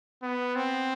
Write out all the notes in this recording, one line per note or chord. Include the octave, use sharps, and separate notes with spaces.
B3
C4